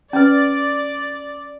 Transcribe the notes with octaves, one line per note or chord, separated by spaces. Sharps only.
C#4 B4 D5